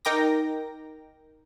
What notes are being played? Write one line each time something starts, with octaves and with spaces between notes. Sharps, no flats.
D#4 A#4 G5 A#5 D6 A#6